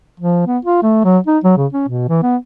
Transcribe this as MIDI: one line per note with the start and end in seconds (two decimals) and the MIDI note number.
0.20 0.42 53
0.47 0.59 59
0.65 0.79 65
0.83 1.00 57
1.05 1.18 54
1.27 1.38 63
1.44 1.53 54
1.57 1.67 49
1.73 1.86 61
1.88 2.07 47
2.09 2.21 52
2.23 2.37 59